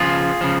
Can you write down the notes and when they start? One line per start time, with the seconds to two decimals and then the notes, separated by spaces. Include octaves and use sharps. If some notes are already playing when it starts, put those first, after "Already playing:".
Already playing: C#3 F3 F4 G#4
0.41 C#3 F3